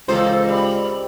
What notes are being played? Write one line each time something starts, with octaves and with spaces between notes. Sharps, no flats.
C#2 E3 A#3 C4 D#4 A4 C5
G3